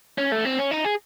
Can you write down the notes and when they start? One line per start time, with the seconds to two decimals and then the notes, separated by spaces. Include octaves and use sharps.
0.18 C#4
0.32 A3
0.45 C4
0.59 C#4
0.71 D#4
0.85 G#4